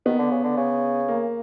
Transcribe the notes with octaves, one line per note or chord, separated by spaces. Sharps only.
D#3 B3
D3
C#3
D3
C#3
A#3